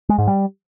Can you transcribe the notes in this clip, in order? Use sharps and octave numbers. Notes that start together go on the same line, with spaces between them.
G#3
G#2
G3